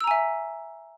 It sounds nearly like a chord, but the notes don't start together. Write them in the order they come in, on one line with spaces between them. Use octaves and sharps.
E6 A#5 G#5 E5